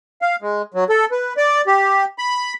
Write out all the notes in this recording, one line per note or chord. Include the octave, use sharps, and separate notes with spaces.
F5
G#3
F#3
A4
B4
D5
G4
B5